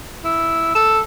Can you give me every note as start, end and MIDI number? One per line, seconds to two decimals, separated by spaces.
0.24 0.70 64
0.75 0.99 69